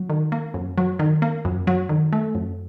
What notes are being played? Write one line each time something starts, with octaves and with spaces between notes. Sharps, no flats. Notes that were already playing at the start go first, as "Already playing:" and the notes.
Already playing: F#3
D#3
A#3
F#2
F#3
D#3
A#3
F#2
F#3
D#3
A3
F#2